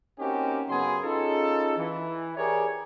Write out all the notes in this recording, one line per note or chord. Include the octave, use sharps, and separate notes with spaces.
A#3 C4 C#4 D#4 F#4 G4
F#2 C#3 F#3 B3 G#4 C6
C#4 D#4 F4 G#4 A4
E3
G4 G#4 A#4 B4 C#5 D5